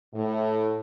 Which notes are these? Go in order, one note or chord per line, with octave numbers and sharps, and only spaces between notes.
A2